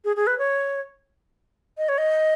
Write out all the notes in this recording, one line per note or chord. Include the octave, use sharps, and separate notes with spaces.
G#4
G#4
B4
C#5
D#5
C#5
D#5